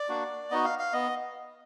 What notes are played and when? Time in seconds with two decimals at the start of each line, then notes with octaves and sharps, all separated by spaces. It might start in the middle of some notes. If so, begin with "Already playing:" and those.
Already playing: D5
0.09 A#3 D4 F#4
0.51 B3 D#4 F#4 D#5
0.65 F5
0.79 F5
0.93 B3 D#5